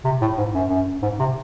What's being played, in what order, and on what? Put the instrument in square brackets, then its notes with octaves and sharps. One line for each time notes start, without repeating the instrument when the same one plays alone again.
[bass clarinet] C3
A2
G#2
F#2
F#2
G#2
C3